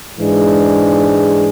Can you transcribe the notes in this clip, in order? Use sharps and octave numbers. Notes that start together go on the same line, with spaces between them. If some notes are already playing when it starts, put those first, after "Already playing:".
G#2 E3 G#3 D4 G#4